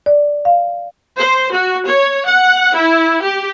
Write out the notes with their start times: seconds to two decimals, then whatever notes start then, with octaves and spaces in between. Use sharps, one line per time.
0.06 D5
0.45 F5
1.17 C5
1.52 F#4
1.85 C#5
2.26 F#5
2.74 E4
3.22 G4